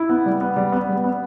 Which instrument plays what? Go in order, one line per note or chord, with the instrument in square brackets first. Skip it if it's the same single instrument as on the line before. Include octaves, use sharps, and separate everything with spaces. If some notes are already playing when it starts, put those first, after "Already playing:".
Already playing: [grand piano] E4
B3
G3
B3
G3
B3
G3
B3